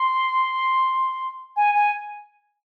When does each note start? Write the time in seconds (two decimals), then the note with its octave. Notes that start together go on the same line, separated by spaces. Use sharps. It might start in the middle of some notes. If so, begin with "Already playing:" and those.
Already playing: C6
1.56 G#5
1.75 G#5